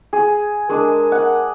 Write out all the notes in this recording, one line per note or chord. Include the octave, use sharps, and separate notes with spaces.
G#4
G#3 D4 A#4
F#5